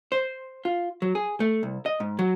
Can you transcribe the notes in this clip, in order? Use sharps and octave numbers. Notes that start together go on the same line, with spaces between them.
C5
F4
F#3
G#4
A3
C2
D#5
G#2
F#3